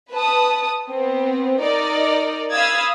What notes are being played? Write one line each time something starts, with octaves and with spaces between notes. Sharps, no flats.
B4 A5 D#6
B3 C4
D#4 A#4 D5
F5 B5 D#6 E6 G#6 A6